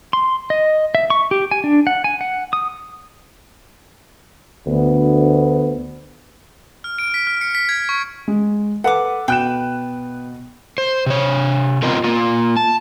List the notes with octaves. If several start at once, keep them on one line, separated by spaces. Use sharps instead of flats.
C6
D#5
E5
C#6
G4
G#5
D4
F#5
G#5
F#5
D#6
D2 B3
F6
D7
B6
F6
C#7
B6
G#6
C#6
G#3
A4 B4 F#5 D6
B2 B4 G5 F#6 E7
C5
C3 C#5
B3 C4 F4 A#4 D#5 A#5
A#3 F4
A5